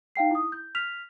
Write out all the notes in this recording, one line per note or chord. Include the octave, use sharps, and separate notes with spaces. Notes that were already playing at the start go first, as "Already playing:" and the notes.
D#4 F5 G5 C7
E4 D#6
G6
F6 B6 F7